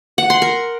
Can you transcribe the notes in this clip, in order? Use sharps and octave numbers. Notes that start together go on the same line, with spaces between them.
F#5
C6
A#4